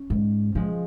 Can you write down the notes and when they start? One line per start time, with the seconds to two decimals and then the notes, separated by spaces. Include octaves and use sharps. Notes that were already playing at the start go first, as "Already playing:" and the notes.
Already playing: C#4
0.10 G#2
0.55 G#2 F3 G#3